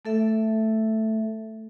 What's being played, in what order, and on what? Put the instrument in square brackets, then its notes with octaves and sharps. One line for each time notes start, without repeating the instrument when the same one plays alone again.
[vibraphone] A3 A4 E5